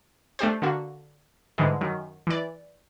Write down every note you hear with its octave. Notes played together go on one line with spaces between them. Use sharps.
A3 D4 G4 C5
D3 A#3 F#4
G#2 D3 E3 G3 G#3
F#2 D#3
E3 D5